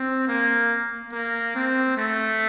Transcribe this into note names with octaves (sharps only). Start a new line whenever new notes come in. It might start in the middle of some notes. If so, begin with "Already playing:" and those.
Already playing: C4
A#3
A#3
C4
A3